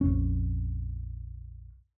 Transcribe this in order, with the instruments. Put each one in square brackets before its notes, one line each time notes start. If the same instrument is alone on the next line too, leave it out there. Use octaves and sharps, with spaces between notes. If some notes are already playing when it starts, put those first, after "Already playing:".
[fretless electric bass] A#1 F2 C#4